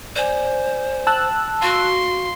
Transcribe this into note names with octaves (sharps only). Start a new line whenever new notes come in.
C5 D5 G#5
G5 A5 E6 F#6
F#4 F5 C6 D7